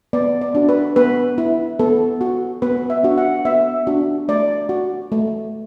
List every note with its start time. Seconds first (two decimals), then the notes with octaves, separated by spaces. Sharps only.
0.13 B3 D5
0.41 D5
0.55 D4 F#4
0.69 B4
0.96 B3 B4
1.38 E4
1.79 B3 A4
2.21 F#4
2.62 B3 B4
2.90 E5
3.03 D4 F#4
3.18 F#5
3.45 B3 E5
3.87 D4 F#4
4.28 A3 D5
4.69 F#4
5.12 A3